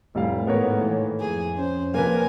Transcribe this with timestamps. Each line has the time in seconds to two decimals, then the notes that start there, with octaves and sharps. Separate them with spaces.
0.15 F1 A2 G3 F5
0.47 G#2 D#3 A#3 B3 A#4 C#5
0.81 E3
1.20 F2 G#4
1.58 C#4 C5
1.94 D#2 C3 F3 A#3 A#4 B4 G#5